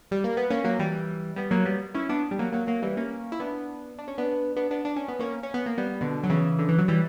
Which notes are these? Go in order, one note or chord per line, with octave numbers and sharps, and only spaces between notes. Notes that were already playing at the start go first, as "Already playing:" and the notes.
G3
A#3
B3
A#3 C#4
F#3 A#3
E3 G3
G3 B3
F#3 A#3
G3 B3
C#4 E4
B3 D4
G3
F#3 A#3
F#3 A#3
F#3 A#3
E3 G3
A#3 C#4
E4
B3 D4
D4
C#4
B3 D4
B3 D4
B3 D4
D4
C#4
B3
A#3 C#4
C#4
B3
A#3
G3 B3
B2 D3
F#3
C#3 E3
D3
E3
F#3
E3 G3